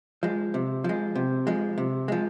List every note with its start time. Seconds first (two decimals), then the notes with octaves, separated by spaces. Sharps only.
0.23 F3 G#3
0.54 C3
0.84 F3 G#3
1.15 C3
1.47 F3 G#3
1.78 C3
2.08 F3 G#3